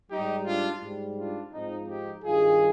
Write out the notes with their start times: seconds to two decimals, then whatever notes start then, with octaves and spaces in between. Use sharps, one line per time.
0.11 G#2 G3 D#4 G4
0.46 D4 F4
0.82 G#2 G3
1.17 D4 F4
1.52 G#2 F3 C4 D#4
1.88 D#4 G4
2.23 G2 D#3 G3 F4 G#4